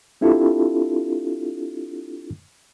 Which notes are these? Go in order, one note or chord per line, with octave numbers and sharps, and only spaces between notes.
C4 D4 E4 F4 G4 A4